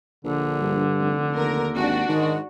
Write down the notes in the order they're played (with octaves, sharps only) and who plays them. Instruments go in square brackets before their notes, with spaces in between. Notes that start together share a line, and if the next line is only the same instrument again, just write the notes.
[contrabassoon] A#1 [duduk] D3
[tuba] G2
[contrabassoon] F1
[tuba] D#2 [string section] A#4
[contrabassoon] G#1 [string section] D4 F#4
[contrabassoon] G#2 [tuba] D#3 [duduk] G#3